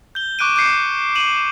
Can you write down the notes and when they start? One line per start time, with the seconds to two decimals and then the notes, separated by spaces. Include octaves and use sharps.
0.15 G6 G7
0.39 C#6 D6 F#6 D7 D#7
0.56 D6 F#6 G6 C7 C#7
1.15 D#7 E7 F#7